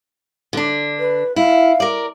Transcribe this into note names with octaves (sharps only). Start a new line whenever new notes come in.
D3 D4
B4
E4 F5
A#4 D5